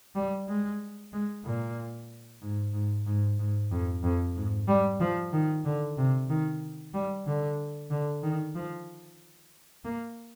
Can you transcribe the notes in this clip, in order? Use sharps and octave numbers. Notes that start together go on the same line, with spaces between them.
G3
G#3
G#3
A#2
G#2
G#2
G#2
G#2
F2
F2
G#2
G3
F3
D#3
D3
C3
D#3
G3
D3
D3
D#3
F3
A#3